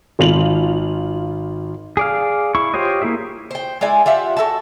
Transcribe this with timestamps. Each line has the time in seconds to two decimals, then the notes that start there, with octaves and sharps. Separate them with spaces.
0.19 G#1 F4 F7 F#7
1.97 G#4 D5 F5
2.55 E4 C#6
2.74 F4 G4 C5 C#5 D#5
3.02 A#3 E4 G#4 E5
3.51 C5 G5
3.81 G#3 E4 D5 G#5
4.06 F4 G4 E5 F#5
4.37 F#4 A4 E5 A5